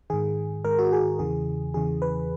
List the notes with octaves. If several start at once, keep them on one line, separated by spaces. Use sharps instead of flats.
G#2 D#3 G#4
G#2 D#3 A#4
F#4
G#4
E2 C#3 E3 G#4
E2 C#3 E3 G#4
B4